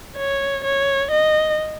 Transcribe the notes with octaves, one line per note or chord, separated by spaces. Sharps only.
C#5
C#5
D#5